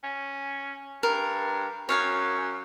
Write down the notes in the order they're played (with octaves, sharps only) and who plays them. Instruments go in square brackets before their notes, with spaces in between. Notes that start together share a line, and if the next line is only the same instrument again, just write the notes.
[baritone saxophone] C#4
[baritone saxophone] G2 [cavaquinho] A#4
[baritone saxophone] F#2 [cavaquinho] C#5 F5 G#5